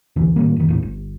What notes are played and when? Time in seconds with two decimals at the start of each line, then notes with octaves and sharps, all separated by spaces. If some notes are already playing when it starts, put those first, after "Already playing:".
0.16 A#1 D#2 D3 E3
0.36 A2 D#3 G3 A#3
0.56 F#1 D#3
0.68 D#2 A2
0.83 G1